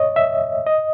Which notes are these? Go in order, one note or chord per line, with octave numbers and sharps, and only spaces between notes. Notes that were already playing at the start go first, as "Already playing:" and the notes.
Already playing: C#5 D#5
E5
D#5